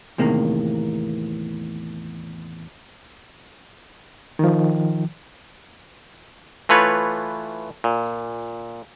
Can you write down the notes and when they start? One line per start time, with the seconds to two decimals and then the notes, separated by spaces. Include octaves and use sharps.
0.18 E2 A2 C3 D#3 A#3
4.39 D#3 F3
6.69 E3 A3 F4 B4 C#5
7.84 A#2